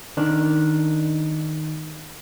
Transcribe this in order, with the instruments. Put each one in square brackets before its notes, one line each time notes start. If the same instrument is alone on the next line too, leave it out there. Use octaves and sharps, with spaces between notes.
[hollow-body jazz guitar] D#3 D4